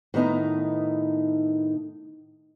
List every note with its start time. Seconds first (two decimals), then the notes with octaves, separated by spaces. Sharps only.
0.14 A2 D#3 B3 D#4 A#5